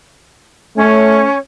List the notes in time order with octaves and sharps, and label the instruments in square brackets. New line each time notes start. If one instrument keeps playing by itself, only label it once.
[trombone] A3 [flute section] C#4 C#5